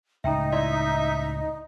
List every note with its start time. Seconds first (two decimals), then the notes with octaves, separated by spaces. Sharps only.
0.24 C#2 A2 D#4 E5 G5 A#5
0.52 E4 D5 E5 C6